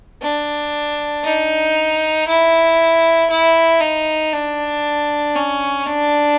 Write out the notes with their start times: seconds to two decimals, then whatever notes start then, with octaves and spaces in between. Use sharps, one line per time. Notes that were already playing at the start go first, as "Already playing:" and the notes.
0.22 D4
1.24 D#4
2.28 E4
3.30 E4
3.81 D#4
4.33 D4
5.36 C#4
5.87 D4